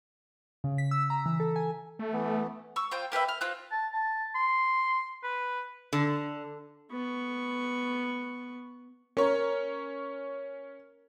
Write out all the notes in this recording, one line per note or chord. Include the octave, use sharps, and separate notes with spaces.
C#3
B6
E6
A#5
E3
A4
G#5
A3
E3 B3
C#6 E6
F4 C5 G5
A#3 G4 B4 E5
F6
C4 F4 F#6
A5
A5
C6
B4
D3
B3 C#6
C#4 A#4 C#5